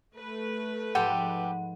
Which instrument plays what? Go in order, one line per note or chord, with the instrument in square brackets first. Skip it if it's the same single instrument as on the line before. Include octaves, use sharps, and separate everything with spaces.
[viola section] A3 B4
[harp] G#2 F3 G#3 [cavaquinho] G4 A4 G5 [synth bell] F#5